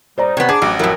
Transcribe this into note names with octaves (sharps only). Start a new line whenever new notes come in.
F2 G3 D#4 C5 D5 A#5
C3 B3 C#5
D4 G#4 D6
A1 F#3
F2 F#3 E4 A#4